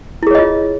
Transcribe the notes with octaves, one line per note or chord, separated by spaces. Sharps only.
E4 F4 G#4 C#5 D#5